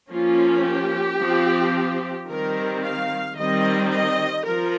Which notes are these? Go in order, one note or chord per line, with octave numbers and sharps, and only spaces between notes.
F3 A#3 C#4 F4
G4
F3 C4
D#3 G3 C4 A#4
F5
D#3 G3 C4 D#5
D#5
F3 A#4